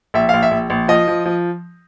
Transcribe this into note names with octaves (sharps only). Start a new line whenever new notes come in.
A#1 E5
A#1 F5
E5
A#1
A#1
F3 D#5
F3
F3